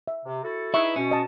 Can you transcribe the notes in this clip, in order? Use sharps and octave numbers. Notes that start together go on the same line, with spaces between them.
E5
C3
E4 F#4 A4
D#4 E4 G#4 B4 E5 C#6
B2 C#4
D#5 A5